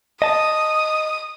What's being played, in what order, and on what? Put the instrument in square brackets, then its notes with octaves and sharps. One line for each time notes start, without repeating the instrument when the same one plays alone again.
[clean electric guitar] D#5 A5 [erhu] D#6